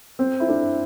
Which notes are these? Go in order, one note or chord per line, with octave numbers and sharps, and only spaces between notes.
C4
E4
D4